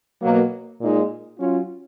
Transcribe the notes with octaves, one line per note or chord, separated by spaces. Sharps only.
B2 F#3 A#3
A#2 G#3 D#4
F#3 C#4 F4